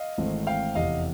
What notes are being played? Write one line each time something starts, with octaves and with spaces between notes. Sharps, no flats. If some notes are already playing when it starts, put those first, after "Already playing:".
Already playing: D#5 F5
G#1 G#2 E3 A3 C4
F5 G5
F1 E2 C3 E3 D#5 F5